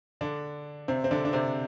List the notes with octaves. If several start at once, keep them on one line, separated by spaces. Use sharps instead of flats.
D3 D4
C3 C4
C4
D3 D4
D4
C3 C4